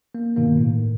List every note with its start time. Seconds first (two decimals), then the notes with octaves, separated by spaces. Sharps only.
0.15 A#3
0.37 G2 B2 D#3 A#3
0.57 A2